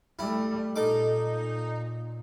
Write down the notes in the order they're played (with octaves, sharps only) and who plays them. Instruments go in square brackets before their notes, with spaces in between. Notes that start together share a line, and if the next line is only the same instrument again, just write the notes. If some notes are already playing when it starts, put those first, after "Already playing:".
[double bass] G3 A3 [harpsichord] E4
[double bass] A#2 [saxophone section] D#4 [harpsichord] A4 D6